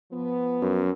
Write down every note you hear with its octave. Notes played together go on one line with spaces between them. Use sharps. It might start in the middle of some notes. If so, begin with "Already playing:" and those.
F3 B3
F#2